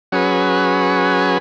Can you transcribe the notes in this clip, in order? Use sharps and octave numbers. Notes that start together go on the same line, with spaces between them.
F#3 C#4 G#4 B4